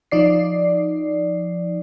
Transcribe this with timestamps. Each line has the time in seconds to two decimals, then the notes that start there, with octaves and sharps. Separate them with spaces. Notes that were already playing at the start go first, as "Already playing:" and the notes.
0.12 F3 D#4 D5 C7